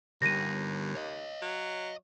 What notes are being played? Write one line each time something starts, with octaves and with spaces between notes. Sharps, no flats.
D#2 D3 G3 A#6 D#7
C#5 D#5
F#3